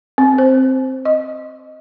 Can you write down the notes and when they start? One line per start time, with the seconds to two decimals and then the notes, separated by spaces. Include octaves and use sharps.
0.18 C4
0.38 C5
1.05 D#5